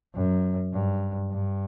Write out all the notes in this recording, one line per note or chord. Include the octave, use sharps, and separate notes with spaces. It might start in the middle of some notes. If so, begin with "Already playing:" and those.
F#2
G2
G2